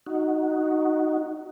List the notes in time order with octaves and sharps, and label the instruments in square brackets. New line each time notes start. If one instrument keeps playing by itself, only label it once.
[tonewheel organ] D#4 F#4